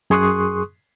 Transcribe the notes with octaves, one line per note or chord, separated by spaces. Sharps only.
F#2 G#4 C6 C#6 D#6 F#6